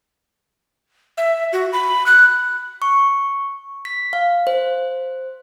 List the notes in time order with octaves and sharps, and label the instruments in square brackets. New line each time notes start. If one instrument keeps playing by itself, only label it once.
[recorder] E5
F#4
B5
F#6
[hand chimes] C#6
B6
F5
C5